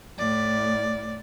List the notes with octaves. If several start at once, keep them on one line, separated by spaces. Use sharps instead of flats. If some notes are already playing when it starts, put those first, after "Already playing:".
A2 D5